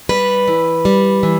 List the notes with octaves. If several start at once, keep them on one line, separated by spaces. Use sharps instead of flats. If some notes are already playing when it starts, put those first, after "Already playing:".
G3 B4
E3
G3
E3